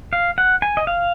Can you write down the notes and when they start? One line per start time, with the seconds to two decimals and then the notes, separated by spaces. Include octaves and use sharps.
0.13 F5
0.38 F#5
0.62 G#5
0.77 D#5
0.87 F5